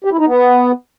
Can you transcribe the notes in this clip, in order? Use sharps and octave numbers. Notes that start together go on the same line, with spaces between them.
G4
E4
D#4
B3